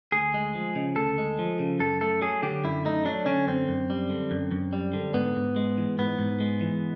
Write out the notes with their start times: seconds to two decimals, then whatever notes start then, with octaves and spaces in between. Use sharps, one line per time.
0.12 D2 G#4
0.34 G#3
0.55 F3
0.75 C#3
0.96 D2 A4
1.18 G#3
1.39 F3
1.59 C#3
1.79 F#2 A4
2.01 A3 A4
2.21 F#3 G#4
2.43 D3 G4
2.64 F#2 E4
2.85 A3 D#4
3.05 F#3 D4
3.26 D3 C#4
3.47 F#2 C4
3.68 F#2
3.90 G3
4.10 D3
4.31 F#2
4.51 F#2
4.73 G3
4.93 D3
5.14 G#2 B3
5.36 G#2
5.56 G#3
5.78 E3
5.98 G#2 B3
6.19 G#2
6.40 G#3
6.61 E3